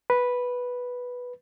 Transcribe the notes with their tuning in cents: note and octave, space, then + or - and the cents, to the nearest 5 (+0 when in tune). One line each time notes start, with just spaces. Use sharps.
B4 -5